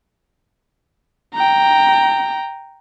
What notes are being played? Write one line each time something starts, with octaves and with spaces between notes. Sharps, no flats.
G5 A#5